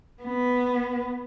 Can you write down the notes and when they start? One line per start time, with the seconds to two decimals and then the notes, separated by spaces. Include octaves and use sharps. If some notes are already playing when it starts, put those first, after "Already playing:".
0.23 B3